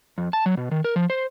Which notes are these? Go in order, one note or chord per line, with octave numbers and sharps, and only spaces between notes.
F2
A5
F#3
B2
D#3
A#4
F3
C5